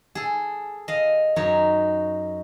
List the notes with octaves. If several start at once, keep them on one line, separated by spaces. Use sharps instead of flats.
G#4 A4
D#5 F5
F#2 D#4 C#5